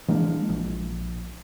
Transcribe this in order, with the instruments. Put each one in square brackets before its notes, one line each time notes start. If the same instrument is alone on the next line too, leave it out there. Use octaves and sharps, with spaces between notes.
[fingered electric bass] E3 G#3 A#3 D4
A#1